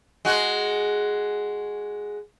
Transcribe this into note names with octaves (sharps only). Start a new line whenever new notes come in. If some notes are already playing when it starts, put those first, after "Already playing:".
G#3 F#4